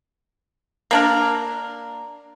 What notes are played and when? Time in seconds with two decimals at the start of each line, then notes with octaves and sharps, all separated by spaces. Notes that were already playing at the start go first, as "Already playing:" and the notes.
0.91 A#3 D4 A#4